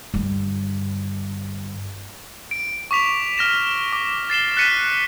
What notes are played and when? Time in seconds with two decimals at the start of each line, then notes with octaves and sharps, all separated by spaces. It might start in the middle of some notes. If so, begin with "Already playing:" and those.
0.14 G2 D3
2.51 D7
2.91 C#6 D6 B6 F7
3.38 F6 A#6 E7
3.93 D6
4.30 A6 C7 E7 G7
4.57 F#6 A6 B6 C#7 D#7